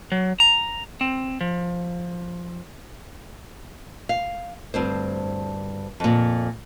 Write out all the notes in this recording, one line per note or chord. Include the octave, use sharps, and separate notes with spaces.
F#3
A#5
C4
F3
F5
D2 G2 C4 C5
F2 A#2